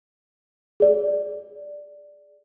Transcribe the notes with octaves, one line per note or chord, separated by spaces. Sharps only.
G#4 D5